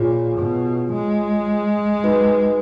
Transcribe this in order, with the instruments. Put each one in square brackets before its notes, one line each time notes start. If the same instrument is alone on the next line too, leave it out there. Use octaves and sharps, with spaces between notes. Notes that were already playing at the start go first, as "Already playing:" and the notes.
Already playing: [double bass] A#2 [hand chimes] F4 G#4 C#5
[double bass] B2
G#3
[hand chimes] D#4 F#4 B4